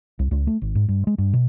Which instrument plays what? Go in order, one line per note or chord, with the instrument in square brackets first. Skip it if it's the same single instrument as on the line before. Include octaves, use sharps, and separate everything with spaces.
[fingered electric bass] C2
C#2
A3
G#1
G#2
G2
G#3
G2
B2